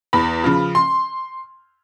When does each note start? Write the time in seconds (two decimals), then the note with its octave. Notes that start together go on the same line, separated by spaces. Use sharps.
0.13 E2 B5
0.44 C#3 F3
0.75 C6